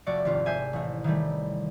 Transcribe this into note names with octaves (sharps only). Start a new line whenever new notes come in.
F1 A3 F#4 D5 C#7
G#1 C3 F4
G#4 C5 E5 G#5
A1 A3
D#3 E3 G3 A3